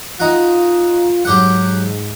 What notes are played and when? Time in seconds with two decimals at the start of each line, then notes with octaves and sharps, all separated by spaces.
0.20 D#4 F4 F#4
1.25 G#2 F#3 G4 F#5